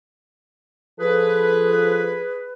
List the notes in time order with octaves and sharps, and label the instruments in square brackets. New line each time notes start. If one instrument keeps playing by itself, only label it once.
[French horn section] F3 A4 [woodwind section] G#4 B4